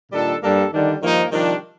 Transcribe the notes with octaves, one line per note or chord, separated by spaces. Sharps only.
A#2 D#3 G3 D4 A4
G2 G3 A#3 D4 A4
D3 D#3 G3 D4
G2 D#3 F3 A#3 D#4
C3 D#3 F3 G3 D4